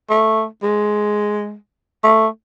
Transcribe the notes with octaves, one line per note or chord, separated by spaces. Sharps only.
A3
G#3
A3